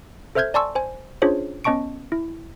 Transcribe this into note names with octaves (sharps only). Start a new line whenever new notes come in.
A4 C5 E5 F6 G6 G#6
D5 G#5 A5 C6 C#6 E6
C5 G#5
C#4 D4 F4 G#4 C5 C#5
B3 C#4 D#5 A5 C#6 D7
E4